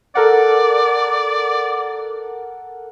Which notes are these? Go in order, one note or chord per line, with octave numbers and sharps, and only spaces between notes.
A4 A#4 D5 F#5